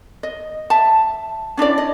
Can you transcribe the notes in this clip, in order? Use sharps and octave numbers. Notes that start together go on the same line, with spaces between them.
D#5
E5 A5
C#4 D4 E4 D5
D#5